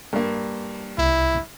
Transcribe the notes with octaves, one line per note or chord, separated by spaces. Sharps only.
G2 A#3
C2 E4